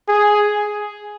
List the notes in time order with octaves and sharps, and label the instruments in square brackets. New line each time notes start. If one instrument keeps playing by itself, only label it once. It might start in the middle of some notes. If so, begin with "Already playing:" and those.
[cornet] G#4